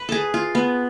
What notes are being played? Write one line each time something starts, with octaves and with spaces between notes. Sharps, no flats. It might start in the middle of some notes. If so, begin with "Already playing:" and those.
Already playing: B4
G#4 A4
F4
B3